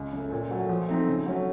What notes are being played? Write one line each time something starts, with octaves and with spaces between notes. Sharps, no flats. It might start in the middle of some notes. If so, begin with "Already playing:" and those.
Already playing: C#2
C#3 A3
A#2
F#3 A3
F3
A3 C4 D#4
C#3
F#3 A3 C#4